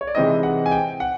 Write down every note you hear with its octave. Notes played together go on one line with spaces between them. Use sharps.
C#5
D5
C3 E3 G#3 C4 D#4 D#5
F#5
G#5
G5
F#5